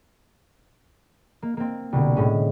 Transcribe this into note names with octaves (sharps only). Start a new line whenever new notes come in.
A#3
A#3 C4
C2 B2 D3
A2 G#3 C#4